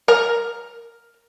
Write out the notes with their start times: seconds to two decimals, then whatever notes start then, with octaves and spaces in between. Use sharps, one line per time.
0.08 A#4 A#5